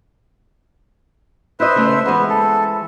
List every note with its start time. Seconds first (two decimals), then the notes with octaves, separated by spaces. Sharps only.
1.60 E4 B4 C5 D#5 E5
1.75 C#3 A3 C4
2.06 E3 G#3 B3 C5
2.30 A4